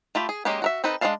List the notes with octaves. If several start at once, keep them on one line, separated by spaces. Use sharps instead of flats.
A3 F4 G4 B5
G#4
F#3 G#3 A#3 C#4 G4
F#4 A#4 E5
C4 D#4 A4 B4
G#3 D4 C5 F5 A5